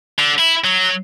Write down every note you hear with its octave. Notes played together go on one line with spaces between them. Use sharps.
D3
E4
F#3